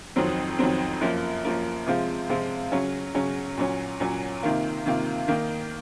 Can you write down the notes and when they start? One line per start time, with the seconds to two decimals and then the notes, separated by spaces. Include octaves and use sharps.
0.16 F2 D#3 F#3 C4
0.59 F2 D#3 F#3 C4
1.01 F#2 F3 A#3
1.45 F#2 F3 A#3
1.86 C3 F3 G#3 C4 F4
2.29 C3 F3 G#3 C4 F4
2.72 C#3 F#3 C#4
3.14 C#3 F#3 C#4
3.57 A#2 F#3 C#4
4.00 A#2 F#3 C#4
4.43 C3 D#3 A#3 F4
4.86 C3 D#3 A#3 F4
5.28 D#3 A#3 D#4